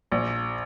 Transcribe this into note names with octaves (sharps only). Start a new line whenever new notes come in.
A#1